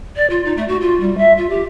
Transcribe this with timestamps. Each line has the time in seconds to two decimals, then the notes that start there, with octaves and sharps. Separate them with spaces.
0.16 D5
0.30 F4
0.45 D#4
0.57 A3
0.68 F#4
0.82 F4
1.01 G3
1.18 E5
1.38 F4
1.50 G4